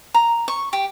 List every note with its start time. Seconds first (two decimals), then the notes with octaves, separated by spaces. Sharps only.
0.14 A#5
0.48 C#6
0.73 G4